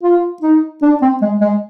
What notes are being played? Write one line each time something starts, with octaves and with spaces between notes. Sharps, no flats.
F4
D#4
D4
C4
G#3
G#3